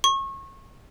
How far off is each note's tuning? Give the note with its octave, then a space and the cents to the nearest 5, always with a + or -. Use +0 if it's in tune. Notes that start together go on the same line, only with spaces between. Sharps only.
C#6 -30